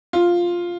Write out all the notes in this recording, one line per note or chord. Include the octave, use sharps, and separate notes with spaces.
F4